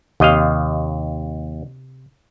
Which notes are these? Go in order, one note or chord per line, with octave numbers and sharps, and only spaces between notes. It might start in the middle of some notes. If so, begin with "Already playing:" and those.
D#2 C3 D#5 F5